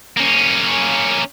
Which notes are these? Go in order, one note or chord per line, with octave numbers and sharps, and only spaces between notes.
A#3 C#4